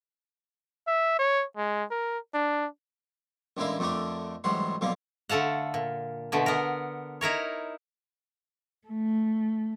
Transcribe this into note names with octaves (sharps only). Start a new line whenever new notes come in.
E5
C#5
G#3
A#4
D4
A1 D3 G#3 E4 A#4 F5
F2 D3 A3 D4 A#4
A1 G#2 F#3 G3 F#5 C6
B1 D3 F3 A#3 F5
D3 A3 A4 F5 F#5
A#2
B2 D3 A3
B3 A#4
D#4 E4 A#4 C#5
A3